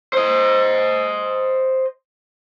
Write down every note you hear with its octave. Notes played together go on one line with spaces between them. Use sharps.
C5 D#5